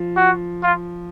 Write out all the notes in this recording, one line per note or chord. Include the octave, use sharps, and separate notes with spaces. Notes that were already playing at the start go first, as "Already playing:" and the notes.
Already playing: F3
F#4
F4